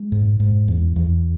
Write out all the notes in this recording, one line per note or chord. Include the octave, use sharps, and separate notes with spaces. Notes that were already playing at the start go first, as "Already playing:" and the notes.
Already playing: G#3
G#2
G#2
E2
E2